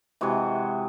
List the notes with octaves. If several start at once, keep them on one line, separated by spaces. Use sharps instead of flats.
C3 E3 G#3 F#4